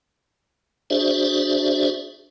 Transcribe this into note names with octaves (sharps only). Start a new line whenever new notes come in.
D4 F#4 G#4 C5 D5 E5